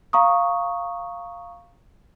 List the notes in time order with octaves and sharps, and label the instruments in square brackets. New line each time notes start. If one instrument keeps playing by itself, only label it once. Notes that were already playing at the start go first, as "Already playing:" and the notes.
[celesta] F5 A#5 C#6 D#6